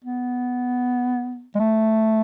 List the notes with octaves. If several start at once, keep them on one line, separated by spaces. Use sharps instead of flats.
B3
G#3
A3